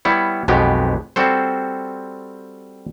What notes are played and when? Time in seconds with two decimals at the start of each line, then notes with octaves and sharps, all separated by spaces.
0.05 G3 B3 E4 C#5
0.48 B1 F2 B2 G#3 B3 G4
1.16 G3 C4 F#4 A4 C5